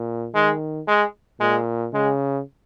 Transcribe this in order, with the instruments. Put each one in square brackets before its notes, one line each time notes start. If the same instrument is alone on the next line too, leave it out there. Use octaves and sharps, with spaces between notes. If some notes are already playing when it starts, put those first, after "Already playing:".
Already playing: [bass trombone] A#2
[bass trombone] D#3 [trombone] G#3
[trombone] G#3
[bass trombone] A#2 [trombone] G#3
[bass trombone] C#3 [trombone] G#3